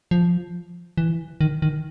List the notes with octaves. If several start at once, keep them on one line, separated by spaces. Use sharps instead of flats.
F3
E3
D#3
D#3